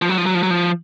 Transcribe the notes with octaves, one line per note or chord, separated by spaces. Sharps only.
F3
F#3
F3
F#3
F3
F#3
F3